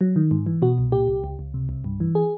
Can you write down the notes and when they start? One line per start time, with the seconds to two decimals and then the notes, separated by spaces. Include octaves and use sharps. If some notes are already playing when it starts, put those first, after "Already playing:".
0.01 F#3
0.16 D#3
0.31 G#2
0.46 E3
0.62 B2 F#4
0.78 C2
0.92 A#2 G4
1.08 C2
1.24 C#2
1.39 C#2
1.54 C3
1.69 C2
1.84 G2
2.00 E3
2.15 G#4